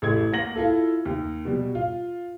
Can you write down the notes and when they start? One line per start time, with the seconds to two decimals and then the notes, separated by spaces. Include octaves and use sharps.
0.02 A1 A3 E4 G#6
0.32 A#3 F#5 A#6 F#7
0.56 E4 F4 A4
1.05 D#2
1.45 B2 G3
1.75 F4